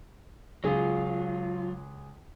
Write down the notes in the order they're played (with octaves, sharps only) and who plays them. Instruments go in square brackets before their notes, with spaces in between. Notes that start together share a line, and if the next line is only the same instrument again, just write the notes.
[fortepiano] C#2 G#4 [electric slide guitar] F#3 F4